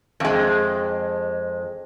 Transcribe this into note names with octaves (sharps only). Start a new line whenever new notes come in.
F2 G#3